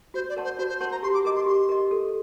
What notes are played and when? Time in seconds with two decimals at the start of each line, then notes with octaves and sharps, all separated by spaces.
0.14 F#4 C5
0.29 D5
0.37 A#4 F#5 A5 C6
0.44 C5
0.58 F#4 C5
0.69 C5
0.80 A#4 C5 F#5 A5 C6
0.91 A#5
1.03 G4 C6
1.14 D6
1.25 A#4 D#5 D6
1.36 C6
1.46 G4 C6
1.69 A#4 D#5
1.91 A4